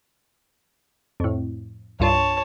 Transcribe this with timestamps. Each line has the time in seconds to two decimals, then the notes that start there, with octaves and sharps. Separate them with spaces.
1.20 F2 A2
2.00 C2 G2 F4 C#5 A5